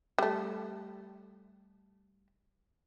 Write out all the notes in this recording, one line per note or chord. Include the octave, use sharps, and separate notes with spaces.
G3 A3